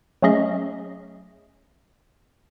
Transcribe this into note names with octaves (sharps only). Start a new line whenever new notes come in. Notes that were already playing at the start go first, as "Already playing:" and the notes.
F#3 A3 C#4 G#4 D#5 E5